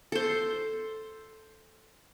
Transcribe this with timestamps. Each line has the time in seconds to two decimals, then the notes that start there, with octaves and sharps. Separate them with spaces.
0.12 A4 C5